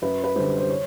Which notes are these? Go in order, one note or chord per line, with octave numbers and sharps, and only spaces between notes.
F#2 B4
B4
D3 G3 C5
C5
C#5